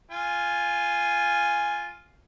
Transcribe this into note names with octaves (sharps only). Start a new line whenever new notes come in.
F4 G#5